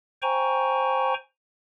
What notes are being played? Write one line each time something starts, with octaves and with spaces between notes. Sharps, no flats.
C5 G5 G#5 A#5 C#6